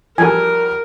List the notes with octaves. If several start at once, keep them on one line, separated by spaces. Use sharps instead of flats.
F3 G3 F#4 A4 A#4 G#5